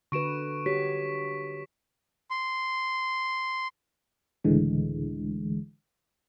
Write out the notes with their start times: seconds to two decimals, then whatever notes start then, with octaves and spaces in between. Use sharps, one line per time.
0.12 D3 F#4 B4 C#6 D7 E7
0.66 F#4 G4 C#5 B6
2.30 C6
4.44 C#2 A2 D3 E3 G#3